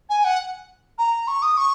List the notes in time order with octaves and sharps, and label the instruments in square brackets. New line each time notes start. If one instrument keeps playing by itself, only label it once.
[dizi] G#5
F#5
A#5
C#6
D#6
C#6